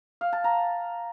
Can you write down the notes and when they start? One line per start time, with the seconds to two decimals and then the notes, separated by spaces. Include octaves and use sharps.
0.21 F5
0.33 A5
0.44 A#5